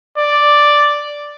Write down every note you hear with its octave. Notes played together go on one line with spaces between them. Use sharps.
D5